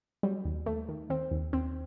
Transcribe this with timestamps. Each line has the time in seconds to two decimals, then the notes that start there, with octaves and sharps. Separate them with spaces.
0.23 F#3 G3
0.45 D#2
0.66 D#2 A3
0.89 D#3
1.10 D#2 C4
1.31 D#2
1.53 D#2 C4